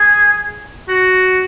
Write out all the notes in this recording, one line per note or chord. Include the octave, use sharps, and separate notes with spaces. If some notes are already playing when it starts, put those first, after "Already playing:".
Already playing: G#4
F#4